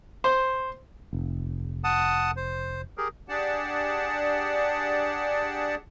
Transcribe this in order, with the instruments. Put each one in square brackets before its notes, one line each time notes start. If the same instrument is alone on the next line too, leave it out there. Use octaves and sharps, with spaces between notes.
[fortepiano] C5
[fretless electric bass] F1
[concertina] F#5 A5 D#6
C5
G4 G#4 A#4
[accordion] D4 G4 G#4 D5 F#5 A5